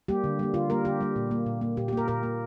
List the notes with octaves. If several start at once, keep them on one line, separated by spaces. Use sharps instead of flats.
G3 A#3 G4
D3
G3 A#3
D3 F4
G3 A#3 A#4
D3 G4
G3 A#3
A#2
A#3
A#2
A#3
A#2 G4
G4
A#3 A#4
A#2 A#4
A#3